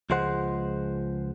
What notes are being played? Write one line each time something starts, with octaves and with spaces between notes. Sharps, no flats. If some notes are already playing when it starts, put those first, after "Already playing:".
C#2 F3 G#3 C5 F#5